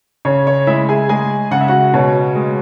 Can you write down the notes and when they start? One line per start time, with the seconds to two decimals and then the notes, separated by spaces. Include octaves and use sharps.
0.25 C#3 C#5
0.47 C#5
0.67 G#3 E4 E5
0.89 G#4 G#5
1.09 G#3 G#4 G#5
1.51 C#3 F#5
1.61 E5
1.68 F#4 F#5
1.94 B2 C#5
2.35 G#3